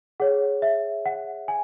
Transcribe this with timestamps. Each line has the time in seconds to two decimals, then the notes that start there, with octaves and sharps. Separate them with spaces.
0.20 G#4 C#5 F#5
0.62 E5
1.06 F#5
1.48 G#5